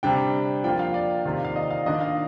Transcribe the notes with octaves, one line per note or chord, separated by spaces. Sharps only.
C3 G3 D4 G5
F3 A#3 F4 G5
F5
D5
C3 D#3 A#3 F4
F5
D#5
F5
D#3 A#3 D4 F4 D#5
F5